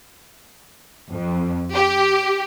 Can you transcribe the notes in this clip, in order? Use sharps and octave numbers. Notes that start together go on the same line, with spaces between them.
F2
G4